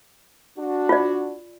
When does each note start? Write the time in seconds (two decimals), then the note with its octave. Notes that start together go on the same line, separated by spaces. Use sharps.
0.56 D4 F#4
0.89 F4 D5